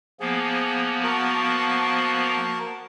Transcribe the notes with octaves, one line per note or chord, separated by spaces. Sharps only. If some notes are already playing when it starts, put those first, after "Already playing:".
F3 A#3 B3 G#4
F#4 A#4 A5